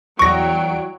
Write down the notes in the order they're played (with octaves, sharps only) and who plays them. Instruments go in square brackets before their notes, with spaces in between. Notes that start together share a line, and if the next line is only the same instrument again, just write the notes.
[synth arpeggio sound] E2 D7 [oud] E3 G3 D#5 [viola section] F#3 [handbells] C#6 A#6